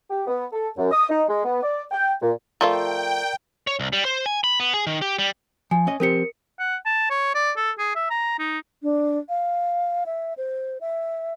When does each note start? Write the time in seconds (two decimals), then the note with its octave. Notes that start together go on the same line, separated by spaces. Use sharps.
0.10 G4
0.27 B3
0.52 A4
0.77 F#2
0.91 D#6
1.09 D#4
1.28 G#3
1.45 B3
1.63 D5
1.91 G5
2.21 A#2
2.61 F3 A3 F4 A#4 D5 G5 A#5
3.67 C#5
3.80 C2
3.93 G3
4.05 C5
4.26 G#5
4.44 B5
4.60 B3
4.74 G#4
4.87 D#3
5.02 G4
5.19 G3
5.71 F3 G#5
5.87 C#4 D#5
6.00 F3 C4 G4 A#4 C#7
6.59 F#5
6.86 A5
7.10 C#5
7.35 D5
7.57 A4
7.79 G#4
7.96 E5
8.11 A#5
8.39 D#4
8.82 D4
9.29 F5
10.06 E5
10.37 C5
10.81 E5